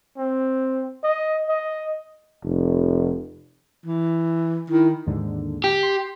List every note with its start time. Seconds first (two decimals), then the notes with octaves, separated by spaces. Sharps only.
0.17 C4
1.04 D#5
1.49 D#5
2.44 F1
3.86 E3
4.70 D#3 E4
5.07 D#2 G#2 D3
5.64 G4
5.83 C6